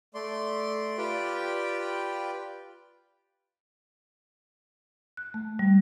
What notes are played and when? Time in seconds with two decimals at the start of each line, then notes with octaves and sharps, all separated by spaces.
0.14 A3 D5 C6
0.98 F4 G4 B4 D5 G5
5.17 F#6
5.34 A3
5.59 G3